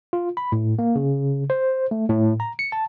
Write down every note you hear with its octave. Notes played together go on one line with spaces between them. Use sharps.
F4
B5
A2
A#3
C#3
C5
A3
A2
A#5
C#7
A5